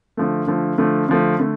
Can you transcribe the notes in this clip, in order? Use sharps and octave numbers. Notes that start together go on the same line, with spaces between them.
D3 F3 A3
D3 F3 A3
D3 F3 A3
D3 F3 A3
D3 A3